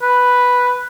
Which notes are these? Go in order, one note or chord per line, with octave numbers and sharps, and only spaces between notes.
B4